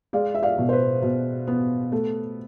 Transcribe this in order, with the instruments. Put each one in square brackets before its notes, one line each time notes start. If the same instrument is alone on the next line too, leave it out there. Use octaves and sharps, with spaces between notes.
[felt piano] G#3 D5 F5
E5
D5 F5
B2
C5
B4
B2
B3
A3